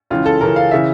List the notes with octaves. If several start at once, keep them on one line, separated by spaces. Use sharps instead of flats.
C#2 C#3 E3 F4
A4
C#2 C#3 E3 A#4
F5
C#3 E3 E5